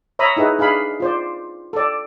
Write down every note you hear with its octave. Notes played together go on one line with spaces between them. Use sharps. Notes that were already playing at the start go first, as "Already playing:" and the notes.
C#5 E5 A#5 B5 D#6
D#4 E4 G#4 B4
D4 G#4 F5 B5
F4 C5 D5
A4 D5